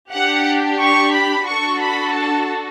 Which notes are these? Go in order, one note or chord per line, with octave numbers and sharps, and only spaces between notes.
D4 G4 F#5
C#6
B5
D4 F#4 A4 C#6
B5
A5